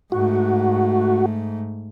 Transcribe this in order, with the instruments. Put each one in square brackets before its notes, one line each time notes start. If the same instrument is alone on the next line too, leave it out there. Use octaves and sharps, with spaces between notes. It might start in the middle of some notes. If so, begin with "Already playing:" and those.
[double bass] G#2 A3 [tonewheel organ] F#4